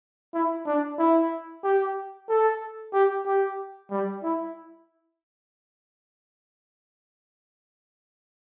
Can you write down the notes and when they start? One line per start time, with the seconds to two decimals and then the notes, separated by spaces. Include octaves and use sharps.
0.34 E4
0.66 D4
0.99 E4
1.64 G4
2.29 A4
2.93 G4
3.26 G4
3.91 G3
4.23 E4